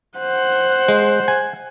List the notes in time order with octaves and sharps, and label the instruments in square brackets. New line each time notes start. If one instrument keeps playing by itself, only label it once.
[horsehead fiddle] C5 F#5
[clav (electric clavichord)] G#3
G#5